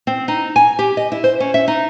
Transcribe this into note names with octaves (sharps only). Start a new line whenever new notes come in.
C4
D#4
G#5
G4
D#5
E4
C5
C#4
E5
D#4